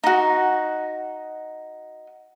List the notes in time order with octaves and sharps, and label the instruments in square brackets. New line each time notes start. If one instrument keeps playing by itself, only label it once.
[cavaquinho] D#4 F#4